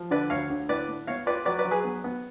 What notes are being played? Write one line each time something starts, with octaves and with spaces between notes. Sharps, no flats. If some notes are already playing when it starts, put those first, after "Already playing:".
Already playing: F3
D3 B4 D5
D2 C#5 F5
D3
A2 B4 D5
A2
B3 C#5 F5
F4 B4 D5
F#3 B4 D5
B4 D5
F#3
G#4 B4
B3
B3